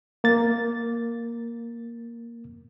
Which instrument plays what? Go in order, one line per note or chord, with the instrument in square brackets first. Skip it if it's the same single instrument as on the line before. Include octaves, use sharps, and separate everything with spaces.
[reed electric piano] A#3 A6